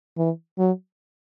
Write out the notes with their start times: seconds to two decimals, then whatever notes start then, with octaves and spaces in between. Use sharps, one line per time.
0.18 E3
0.59 F#3